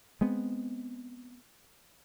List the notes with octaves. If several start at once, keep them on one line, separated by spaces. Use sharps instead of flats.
G#3 B3 C4